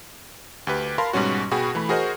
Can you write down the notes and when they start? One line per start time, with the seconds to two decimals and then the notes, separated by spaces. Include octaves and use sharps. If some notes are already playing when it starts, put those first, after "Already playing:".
0.67 D2 G4 B4
0.98 A#4 F5 A5 B5 C6
1.13 G#2 B2 G3 C#4 F#4
1.51 B2 F#4 G#4 G5 B5
1.75 E3 A3 B5
1.89 F#4 G#4 A#4 C5 D#5 F#5